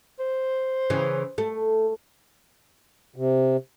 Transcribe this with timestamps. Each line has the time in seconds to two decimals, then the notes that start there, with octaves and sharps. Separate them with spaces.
0.20 C5
0.90 C#3 E3
1.38 A3
3.16 C3